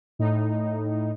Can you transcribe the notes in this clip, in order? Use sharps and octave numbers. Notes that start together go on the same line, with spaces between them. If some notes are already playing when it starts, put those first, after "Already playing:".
A2 D#4